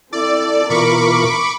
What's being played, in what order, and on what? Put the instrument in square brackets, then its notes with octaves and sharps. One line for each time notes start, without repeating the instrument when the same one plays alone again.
[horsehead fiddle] C4 A4 [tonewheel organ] E4 [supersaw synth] D5
[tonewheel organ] B2 E3 F4 [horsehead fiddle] A#4 [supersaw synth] B5 C#6 D6